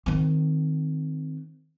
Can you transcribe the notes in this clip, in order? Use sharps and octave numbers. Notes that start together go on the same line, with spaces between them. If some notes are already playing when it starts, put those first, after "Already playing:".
D#3 C4